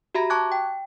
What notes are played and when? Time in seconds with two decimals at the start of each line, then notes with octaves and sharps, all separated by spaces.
0.15 F#4 G4 E5 A#5 B5 A#6
0.30 A5 C#6 D6 F#6 G#6
0.52 G5